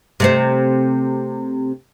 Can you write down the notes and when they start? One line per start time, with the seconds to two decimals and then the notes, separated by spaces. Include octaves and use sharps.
0.20 C3 A3 C4